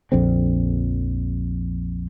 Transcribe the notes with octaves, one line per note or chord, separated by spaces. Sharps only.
A#1 F2 D3 C4